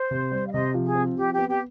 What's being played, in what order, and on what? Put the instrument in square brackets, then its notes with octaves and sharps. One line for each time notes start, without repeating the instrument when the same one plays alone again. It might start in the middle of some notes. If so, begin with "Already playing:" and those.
Already playing: [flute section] C5
[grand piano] C3
G3
[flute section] F5
[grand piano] C3 [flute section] C5 D#5
[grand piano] F3
[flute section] G#4
[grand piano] C4
[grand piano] F3 [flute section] G4
[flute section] G4
[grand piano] B3
[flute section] G4